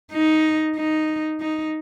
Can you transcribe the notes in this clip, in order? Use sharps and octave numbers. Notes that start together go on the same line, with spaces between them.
D#4
D#4
D#4